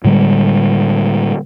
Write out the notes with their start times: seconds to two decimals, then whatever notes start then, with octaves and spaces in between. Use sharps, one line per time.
0.04 A2 D3 G3 G#3